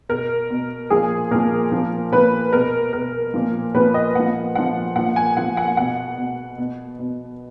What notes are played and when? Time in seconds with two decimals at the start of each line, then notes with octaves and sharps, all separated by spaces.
0.09 B2 A#4
0.50 B2
0.90 A#2 F3 G#4
1.31 A#2 F3 A#4
1.72 A#2 F3
2.12 A#2 F3 B4
2.53 B2 A#4
2.93 B2 A#4
3.34 A#2 F3
3.74 A#2 F3 B4
3.94 D#5
4.15 A#2 F3 F#5
4.56 A#2 F3 F#5
4.96 A#2 F3 F#5
5.16 G#5
5.37 A#2 F3 F#5
5.57 F#5
5.77 B2 F#5
6.18 B2
6.58 B2
6.99 B2